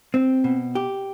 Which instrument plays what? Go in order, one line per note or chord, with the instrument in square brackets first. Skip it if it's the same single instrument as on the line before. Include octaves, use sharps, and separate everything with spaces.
[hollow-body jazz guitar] C4
B2
G4